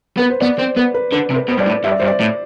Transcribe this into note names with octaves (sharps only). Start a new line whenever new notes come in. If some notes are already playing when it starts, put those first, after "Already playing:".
B3 B4
C5
B3 D5
C4 C5
B3 B4
B4
D3 B4
C3
B4
B2 C5
G2 D5
A2
G2 E5
D5
G2 C5
D5
A2